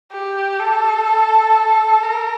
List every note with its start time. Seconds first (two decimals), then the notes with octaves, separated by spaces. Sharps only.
0.12 G4
0.60 A4
2.03 A#4